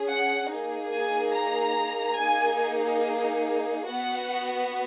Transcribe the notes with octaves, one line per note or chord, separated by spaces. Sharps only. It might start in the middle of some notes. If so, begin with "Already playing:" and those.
Already playing: C#4 G#4
F#5
A#3 D#4 G#4
G#5
A#5
A#3 D#4 G#4 G#5
B3 F#4 F#5